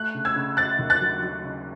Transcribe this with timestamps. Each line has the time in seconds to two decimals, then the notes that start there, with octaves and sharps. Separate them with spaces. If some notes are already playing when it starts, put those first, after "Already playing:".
Already playing: A3 F#6
0.14 C#3
0.25 E6 G#6
0.36 C#3
0.57 C#3 F#6 A6
0.79 D#2
0.90 F#6 A6
1.00 F#3
1.22 F#3
1.44 C#3